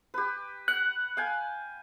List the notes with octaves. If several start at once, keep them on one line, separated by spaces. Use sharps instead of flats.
G4 B4
F#5 F#6
F5 G5 G#5